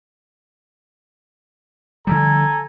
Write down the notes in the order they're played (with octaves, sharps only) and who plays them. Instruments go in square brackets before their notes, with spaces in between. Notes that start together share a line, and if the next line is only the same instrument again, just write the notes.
[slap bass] D3 F3 G3 [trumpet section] A4 G#5 A#5